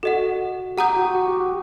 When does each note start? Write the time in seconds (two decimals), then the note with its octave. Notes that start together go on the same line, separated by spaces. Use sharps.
0.03 F#4 A4 D#5 F#5
0.77 G4 F#5 A#5 D#6 G6
0.97 F#4
1.15 F#4
1.28 G4
1.40 F#4